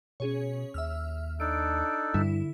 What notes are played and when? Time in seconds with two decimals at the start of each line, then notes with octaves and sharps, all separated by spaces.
0.20 B2 C#4 G#4 C#5
0.74 D#2 E5 E6 F6
1.40 D4 D#4 A4 D7
2.14 G2 D3 E4